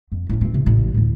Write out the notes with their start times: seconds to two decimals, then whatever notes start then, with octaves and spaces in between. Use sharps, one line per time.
0.12 F2
0.29 A2 C#4
0.41 G2 C4
0.54 C3
0.66 A1
0.94 D2 G2